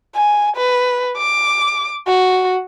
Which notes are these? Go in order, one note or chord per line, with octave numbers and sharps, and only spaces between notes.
G#5
B4
D6
F#4